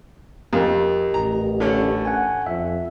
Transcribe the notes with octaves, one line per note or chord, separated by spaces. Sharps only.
F2 G4 A#4 D#5
A1 A#5
D3 A3 C#4
F#5 G#5
F2 E5